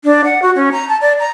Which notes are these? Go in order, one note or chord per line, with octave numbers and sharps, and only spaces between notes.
D4
F#5
F#4
C#4
A#5
A5
D5
A#5